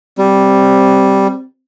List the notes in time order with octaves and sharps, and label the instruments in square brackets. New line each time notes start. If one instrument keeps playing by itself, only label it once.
[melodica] G3 [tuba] C4